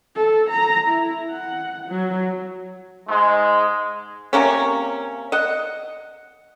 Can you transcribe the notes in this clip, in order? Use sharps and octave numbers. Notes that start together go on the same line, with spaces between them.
A4
A#5
E4
F#5
F#3
G#2 G#3
C3 A#3 C#4
D#5 F#5